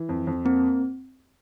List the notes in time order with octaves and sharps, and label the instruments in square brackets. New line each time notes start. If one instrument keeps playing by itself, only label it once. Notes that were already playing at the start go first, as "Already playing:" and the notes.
Already playing: [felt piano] E3
F2
F2
[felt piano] A#3 [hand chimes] C4